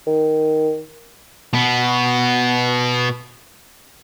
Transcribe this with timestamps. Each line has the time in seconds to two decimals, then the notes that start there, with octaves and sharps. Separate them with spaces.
0.07 D#3
1.53 B2 B3